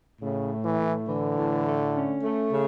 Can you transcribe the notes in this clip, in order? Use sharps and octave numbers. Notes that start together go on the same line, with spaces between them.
A2 C#3
A3
E3
A2
D3 E3
A2
A3
C#4
A3
C#3